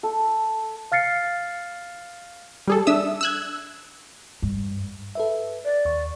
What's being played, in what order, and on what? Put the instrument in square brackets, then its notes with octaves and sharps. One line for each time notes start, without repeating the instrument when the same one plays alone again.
[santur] A4
[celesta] F5 F6 A6 C7 C#7
[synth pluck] G3 G#4 A4
D4 E5 D#6 E6
E6 F#6 G#6
[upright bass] G2
[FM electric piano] A4 B4 E5
[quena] D5
[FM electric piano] D#2 C#6